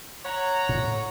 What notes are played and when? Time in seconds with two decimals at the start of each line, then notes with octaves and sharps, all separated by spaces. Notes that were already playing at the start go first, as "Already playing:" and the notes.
0.25 C#5 F#5 A#5
0.69 A2